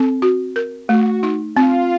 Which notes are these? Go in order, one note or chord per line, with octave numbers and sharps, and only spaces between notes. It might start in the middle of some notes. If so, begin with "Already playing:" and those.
Already playing: C4 A4
F#4
A#4
A3 F#4
D#4
C4 F4